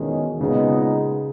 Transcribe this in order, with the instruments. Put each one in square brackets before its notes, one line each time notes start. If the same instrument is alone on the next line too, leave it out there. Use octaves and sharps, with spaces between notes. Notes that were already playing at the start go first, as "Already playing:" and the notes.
Already playing: [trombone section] E2 D#3 G#3 C#4 [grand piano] B2
[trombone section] A#2 G#3 B3 D#4 [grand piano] C#3